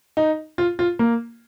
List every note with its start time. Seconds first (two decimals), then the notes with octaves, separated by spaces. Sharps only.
0.17 D#4
0.58 F4
0.79 F4
0.99 A#3